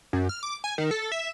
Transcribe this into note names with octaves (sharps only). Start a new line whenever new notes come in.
F#2
F6
D6
G#5
D#3
A4
E5